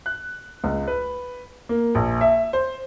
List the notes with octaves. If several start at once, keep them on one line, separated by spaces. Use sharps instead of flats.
F#6
C#2
B4
A#3
A#1
E5
C5